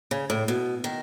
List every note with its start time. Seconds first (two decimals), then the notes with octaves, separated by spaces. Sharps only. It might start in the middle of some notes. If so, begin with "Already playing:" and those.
0.11 C#3
0.30 A2
0.48 B2
0.84 D#3